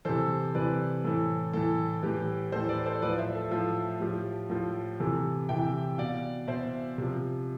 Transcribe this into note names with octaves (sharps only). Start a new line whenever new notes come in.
C3 E3 A4 C5
C3 E3 B4 D5
A2 E3 A4
A2 E3 A4
A2 E3 G4 B4
A2 E3 A4 C5
B4 D5
A4 C5
A2 F3 B4 D5
C5 E5
A4
A2 F3 A4
A2 F3 G4
A2 F3
C3 E3 A4
C3 E3 E5 G5
B2 D5 F5
B2 C5 E5
C3 F3